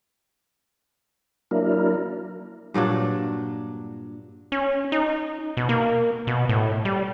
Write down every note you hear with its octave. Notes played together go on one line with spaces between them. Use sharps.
F#3 A#3 D4 E4 A#4
G2 A#2 F#3 D4
C#4
D#4
B2
A#3
B2
A2
G3